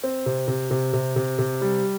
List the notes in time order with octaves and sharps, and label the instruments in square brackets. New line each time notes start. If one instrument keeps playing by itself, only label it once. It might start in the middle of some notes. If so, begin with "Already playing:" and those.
[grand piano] C4
C3
C3
C3
C3
C3
C3
G3